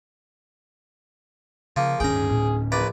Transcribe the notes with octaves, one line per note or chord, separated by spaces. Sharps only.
C#3 F3 A#3
D1 G2 D#3 C#4 G#4 G5 A#5
A2
A#1 B4 D5 A#5